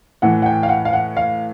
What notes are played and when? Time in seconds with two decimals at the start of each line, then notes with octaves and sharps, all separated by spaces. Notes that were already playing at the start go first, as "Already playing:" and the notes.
0.22 A2 E3 F#5
0.42 F#5
0.46 G5
0.63 F5
0.69 F#5
0.85 F5
0.93 F#5
1.17 F5